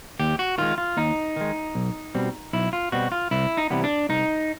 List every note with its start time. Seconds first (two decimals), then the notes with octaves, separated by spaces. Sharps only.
0.20 D#2 G4
0.39 F#4
0.58 D#3 G#3 F4
0.78 F4
0.97 D#2 D#4
1.36 D#3 G#3
1.75 B1
2.15 B2 G3 C4
2.53 B1 E4
2.73 F4
2.92 B2 G3 C4 F#4
3.12 F4
3.31 C2 E4
3.57 D#4
3.70 C3 E3 G3 B3
3.84 D4
4.09 C2 D#4